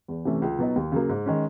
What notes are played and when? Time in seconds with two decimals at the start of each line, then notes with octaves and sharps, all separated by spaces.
0.08 E2
0.25 C3 E3 A3 C#4
0.42 C#2
0.59 B2 F#3 B3 D#4
0.76 D#2
0.92 C#3 F#3 A#3
1.09 G#2
1.26 D#3 G#3 C#4